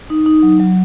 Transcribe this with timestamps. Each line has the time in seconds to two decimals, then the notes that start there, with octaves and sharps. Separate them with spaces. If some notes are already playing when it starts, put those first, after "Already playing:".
0.10 D#4
0.26 D#4
0.43 F#3
0.60 F#3